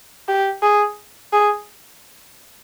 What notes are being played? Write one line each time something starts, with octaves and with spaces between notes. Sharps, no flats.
G4
G#4
G#4